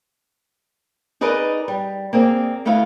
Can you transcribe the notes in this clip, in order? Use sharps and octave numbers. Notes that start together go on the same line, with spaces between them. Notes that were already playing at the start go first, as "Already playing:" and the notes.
D#4 G#4 A#4 B4 D5 D#5
G3
A#3 C4 G#4 D5
D2 A3 B3 E4 F5